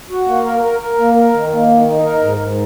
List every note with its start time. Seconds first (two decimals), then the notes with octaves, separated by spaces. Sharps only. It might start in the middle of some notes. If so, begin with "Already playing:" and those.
0.10 F#4
0.27 A#3
0.45 A#4
0.63 A#4
0.80 A#4
0.98 A#3
1.15 A#4
1.33 D#3
1.51 A#3
1.68 D#3
1.86 D#4
2.03 A#4
2.21 G#2
2.39 G#2